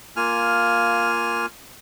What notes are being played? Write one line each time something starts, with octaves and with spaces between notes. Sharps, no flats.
A#3 F4 G#5 F6